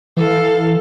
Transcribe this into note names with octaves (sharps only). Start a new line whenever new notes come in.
E3 A4 F5